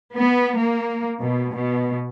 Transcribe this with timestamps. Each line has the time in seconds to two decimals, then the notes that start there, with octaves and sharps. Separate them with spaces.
0.12 B3
0.57 A#3
1.21 B2
1.53 B2